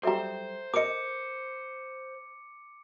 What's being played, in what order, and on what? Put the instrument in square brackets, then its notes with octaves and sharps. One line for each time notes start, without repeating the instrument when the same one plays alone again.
[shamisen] F#3 G3 [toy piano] A4 E5 A#5 [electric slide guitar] C5
[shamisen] A#4 D#5 [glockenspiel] D6 C#7